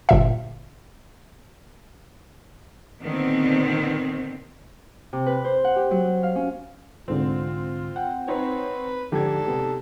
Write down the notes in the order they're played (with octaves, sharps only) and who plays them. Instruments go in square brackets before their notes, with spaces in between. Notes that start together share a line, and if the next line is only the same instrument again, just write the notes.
[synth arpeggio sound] G1 A#2 E5
[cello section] A#2 D3 D#3 B3 C4
[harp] C3
B4
C5
F#5
G4
F#3
F5
C#4
[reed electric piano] C2 G#2 D3 [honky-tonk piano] C4 [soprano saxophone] F4
[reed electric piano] F#5 G5
[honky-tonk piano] C4 D#4 C#5 [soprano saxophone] B4
[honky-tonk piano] G#2 D5 G#6 [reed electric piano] D3 F3 G4 [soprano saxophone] A4
[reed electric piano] C3 B3 G4